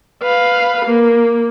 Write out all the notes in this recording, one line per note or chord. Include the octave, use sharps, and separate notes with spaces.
B4 F5
A#3